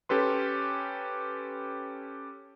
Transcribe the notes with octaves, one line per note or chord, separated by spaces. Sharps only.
C#4 G4 A4 B4 C6